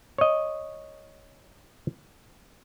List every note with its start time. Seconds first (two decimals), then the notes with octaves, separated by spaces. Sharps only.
0.18 C#5 D#5